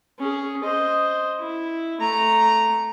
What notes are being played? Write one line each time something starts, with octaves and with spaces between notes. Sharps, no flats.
C#4 G#4
C5 D#5
E4
A3 A#5